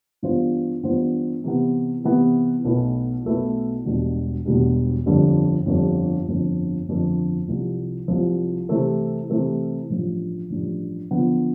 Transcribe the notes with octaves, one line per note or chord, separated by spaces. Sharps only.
G2 E3 B3 F4 C5
G2 E3 B3 F4 C5
C3 E3 B3
C3 E3 B3
B1 B2 A3 E4 B4
B1 B2 A3 E4 B4
E1 E2 B2 G3 D4
E1 E2 B2 G3 D4
G1 F2 D3 G3
G1 F2 D3 G3
G1 F2 D3
G1 F2 D3
C2 C3 F3
C2 C3 F3
C3 E3 A3 C4
C3 E3 A3 C4
A1 G2 F3
A1 G2 F3
D3 F3 B3